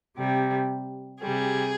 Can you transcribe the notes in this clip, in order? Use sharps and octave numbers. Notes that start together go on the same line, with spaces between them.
C3 G3
C3 G3 G#4